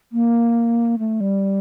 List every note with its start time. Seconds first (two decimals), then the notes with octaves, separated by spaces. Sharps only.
0.12 A#3
0.99 A3
1.20 G3